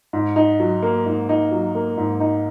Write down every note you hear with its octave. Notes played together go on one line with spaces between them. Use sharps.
G#2
D#4
F#3
A#3
G#2
D#4
F#3
A#3
G#2
D#4